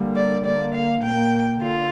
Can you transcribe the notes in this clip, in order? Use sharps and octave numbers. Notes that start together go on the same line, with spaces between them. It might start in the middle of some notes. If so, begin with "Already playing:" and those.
Already playing: D3 G3 A#3
D5
D3 A#3 D5
F5
A#2 A#3 G5
D3 F4